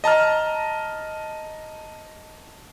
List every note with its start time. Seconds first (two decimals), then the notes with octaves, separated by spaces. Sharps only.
0.04 D#5 A5 A#5 F6